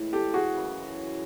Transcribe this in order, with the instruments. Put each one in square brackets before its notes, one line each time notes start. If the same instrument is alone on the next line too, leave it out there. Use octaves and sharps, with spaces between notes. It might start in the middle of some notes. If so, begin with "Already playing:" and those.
Already playing: [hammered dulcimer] A2 E3 G#3
[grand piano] G4 A4
F#4 G#4
[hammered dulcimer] F#2 C#3 E3